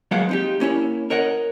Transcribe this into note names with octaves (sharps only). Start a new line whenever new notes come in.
F#3 G#3 A#3 B3 F5 F#5
C4 D#4 G4
A#3 C#4 E4 C#5
A#4 C#5 D#5 F#5